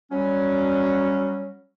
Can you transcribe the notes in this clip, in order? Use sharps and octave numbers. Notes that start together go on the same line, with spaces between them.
F#3 G3 C#4